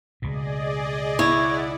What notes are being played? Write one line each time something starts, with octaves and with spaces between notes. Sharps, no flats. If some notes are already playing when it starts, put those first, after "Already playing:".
C#2 B2 G#4 D5 D#5
E4 C#5 D5 E5 F#5